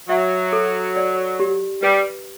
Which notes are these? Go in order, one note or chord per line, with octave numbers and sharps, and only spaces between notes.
F#3 E5
A4
D5
G4
G3 B4